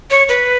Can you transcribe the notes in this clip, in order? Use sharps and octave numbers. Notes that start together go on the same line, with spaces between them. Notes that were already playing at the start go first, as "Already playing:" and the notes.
C#5
B4